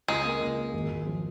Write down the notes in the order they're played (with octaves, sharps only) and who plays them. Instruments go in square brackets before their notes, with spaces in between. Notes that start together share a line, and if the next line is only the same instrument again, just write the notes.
[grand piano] C#2 [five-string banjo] G#3
[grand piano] A#3
C#2
A#3
G#1
G#1
F3